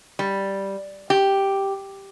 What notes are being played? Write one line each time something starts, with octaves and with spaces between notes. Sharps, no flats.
G3
G4